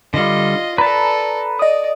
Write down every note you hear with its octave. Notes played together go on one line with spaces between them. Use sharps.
D3 G3 F4 D#5
A4 B4 D5 A5 A#5
D5 D#5 D#6